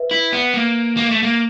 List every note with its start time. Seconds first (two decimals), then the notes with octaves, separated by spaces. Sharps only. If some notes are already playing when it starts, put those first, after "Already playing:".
Already playing: B4 E5
0.11 E4
0.33 B3
0.54 A#3
0.97 A#3
1.11 A3
1.23 A#3